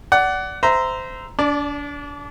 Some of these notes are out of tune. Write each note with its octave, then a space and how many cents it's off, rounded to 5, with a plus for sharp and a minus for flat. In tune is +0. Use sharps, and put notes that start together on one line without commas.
D5 -15 F#5 +20
C5 -20 E5 +0 A#5 +0
D4 -30 D5 +0